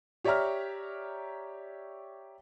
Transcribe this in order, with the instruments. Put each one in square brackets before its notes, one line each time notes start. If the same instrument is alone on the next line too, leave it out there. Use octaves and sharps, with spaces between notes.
[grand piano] G4 C#5 D5 E5 A#5 F6